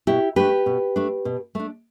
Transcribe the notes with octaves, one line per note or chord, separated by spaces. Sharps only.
B2 E4 G4
A3 D4 G4 B4
B2
A3 D4
B2
A3 D4